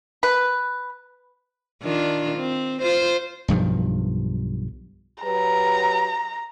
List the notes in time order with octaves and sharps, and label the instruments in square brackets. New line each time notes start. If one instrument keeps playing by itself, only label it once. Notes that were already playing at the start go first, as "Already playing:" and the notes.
[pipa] B4
[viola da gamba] D#3 D4 F4
C4
F4 C5
[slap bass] B1 G2 D#3 F3
[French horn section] F#3 G4 B4 [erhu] A#5